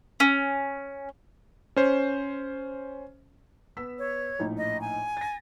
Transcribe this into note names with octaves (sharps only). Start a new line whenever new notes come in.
C#4
C#4 C5
B3 E6 B6
C#5
A#1 A2 D#4
D#5
G#5
A6 A#6